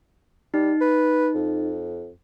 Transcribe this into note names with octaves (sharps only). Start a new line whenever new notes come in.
G3 D#4
B4
F2